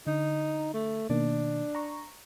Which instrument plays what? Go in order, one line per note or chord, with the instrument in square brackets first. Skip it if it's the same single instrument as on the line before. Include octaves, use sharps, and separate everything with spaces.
[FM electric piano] D3 [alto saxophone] D#4
[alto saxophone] A3
[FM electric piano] B2 D#3 A#3 [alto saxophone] D4
[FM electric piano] A#5 C#6